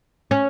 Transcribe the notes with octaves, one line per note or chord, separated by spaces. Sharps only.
C#4